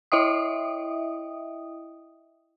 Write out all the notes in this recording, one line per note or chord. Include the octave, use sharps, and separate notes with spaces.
E4 D#5 E5 G5 D#6